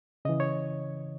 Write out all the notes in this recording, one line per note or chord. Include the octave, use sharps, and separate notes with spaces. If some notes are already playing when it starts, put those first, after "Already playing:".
C#3 E3 D#5
C#5